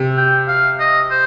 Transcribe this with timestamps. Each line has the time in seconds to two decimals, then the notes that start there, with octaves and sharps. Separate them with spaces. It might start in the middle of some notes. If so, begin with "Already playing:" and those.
Already playing: C3
0.17 G5
0.48 F5
0.79 D#5
1.11 C5